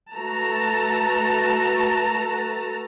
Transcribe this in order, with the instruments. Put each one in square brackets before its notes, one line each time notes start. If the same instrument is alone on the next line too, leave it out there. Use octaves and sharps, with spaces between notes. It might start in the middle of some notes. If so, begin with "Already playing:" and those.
[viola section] A3 F#4 A4 B4 A5 A#5